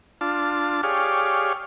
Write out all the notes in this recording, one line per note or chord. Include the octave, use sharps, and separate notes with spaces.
D4 F4 A5
G4 G#4 C#5 D5 F5